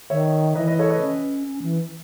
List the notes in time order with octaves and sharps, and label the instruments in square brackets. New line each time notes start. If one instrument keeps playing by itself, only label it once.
[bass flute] D#3 [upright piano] C#5 E5
[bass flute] E3 [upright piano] B4 D#5
[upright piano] B4 D#5
A4 C#5
B4 D#5
[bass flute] C#4
C#4
E3